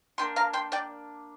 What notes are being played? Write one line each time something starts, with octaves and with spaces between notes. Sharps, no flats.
A#3 D4 F4 G5 C6
F5 A#5
G5 C6
D5 G5